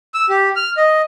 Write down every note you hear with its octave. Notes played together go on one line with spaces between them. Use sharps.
E6
G4
F6
D#5